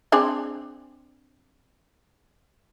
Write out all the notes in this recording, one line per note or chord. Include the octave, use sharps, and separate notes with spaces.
C4 D4 G#4